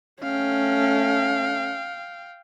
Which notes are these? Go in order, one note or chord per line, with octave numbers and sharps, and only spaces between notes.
A3 C#4 F5 G5